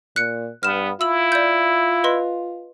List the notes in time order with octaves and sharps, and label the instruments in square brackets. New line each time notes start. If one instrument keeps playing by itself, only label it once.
[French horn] A#2 [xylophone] F#6 C#7
[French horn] G2 [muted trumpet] B3 [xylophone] F6 E7
[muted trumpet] E4 [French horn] F4 [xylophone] E6 F#7
[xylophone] D5 G6
B4 D#5 C6